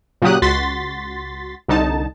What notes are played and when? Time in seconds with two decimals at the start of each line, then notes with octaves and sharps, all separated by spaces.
0.22 A#2 C#3 F#3 G4 D#6 F#6
0.42 C#2 F#4 C6 A6 B6
1.68 C2 D3 D#4 A5